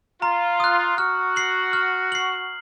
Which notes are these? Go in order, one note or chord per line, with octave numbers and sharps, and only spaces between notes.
F4 A#5
D#6 F#6
F#4 F6
C7 F#7
F6
C7 F#7